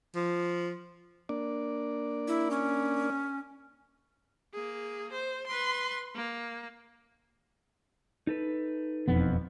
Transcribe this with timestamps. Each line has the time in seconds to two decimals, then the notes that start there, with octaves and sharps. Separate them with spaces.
0.15 F3
1.29 A#3 D4 D5
2.28 E4
2.51 C#4
4.53 A#3 G#4
5.12 C5
5.47 B4 C6
6.15 A#3
8.27 D#4 A4 B4
9.08 E1 F2 B3